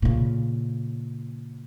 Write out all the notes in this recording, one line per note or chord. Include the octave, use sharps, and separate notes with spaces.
A#2 C#3